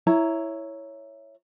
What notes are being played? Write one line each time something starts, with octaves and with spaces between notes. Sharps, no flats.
E4 C#5 A#5